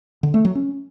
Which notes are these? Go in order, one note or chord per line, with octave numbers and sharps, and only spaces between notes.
D3
A3
F#3
C#4